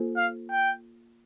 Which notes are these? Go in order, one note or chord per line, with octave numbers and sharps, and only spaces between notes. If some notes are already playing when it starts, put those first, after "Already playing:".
Already playing: A#3 F4 A4 C5
F5
G5